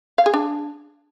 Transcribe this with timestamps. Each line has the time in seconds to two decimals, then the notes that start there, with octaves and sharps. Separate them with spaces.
0.18 F5
0.26 G#4
0.34 D4